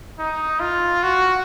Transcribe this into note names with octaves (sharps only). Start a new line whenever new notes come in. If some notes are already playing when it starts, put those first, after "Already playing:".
D#4
F4
F#4